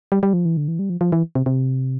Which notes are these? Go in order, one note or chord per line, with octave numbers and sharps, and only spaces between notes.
G3
G3
F3
E3
D3
E3
G3
F3
F3
E3
C3
C3